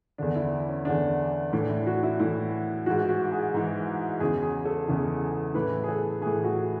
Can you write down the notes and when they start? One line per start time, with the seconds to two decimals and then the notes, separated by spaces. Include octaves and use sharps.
0.18 E2 D3 D4
0.35 E4
0.69 C#4
0.85 E2 D3 D4
1.52 A2 E3 D4
1.70 E4
1.87 F#4
2.03 E4
2.20 A2 E3 E4
2.86 G#2 E3 F#4
3.09 F#4
3.32 G#4
3.54 G#2 E3
4.20 E2 C#3 E3 G#4
4.43 G#4
4.65 A4
4.88 E2 C#3 E3
5.54 A2 E3 B4
5.84 G#4
5.89 A4
6.21 A2 E3 G#4
6.44 F#4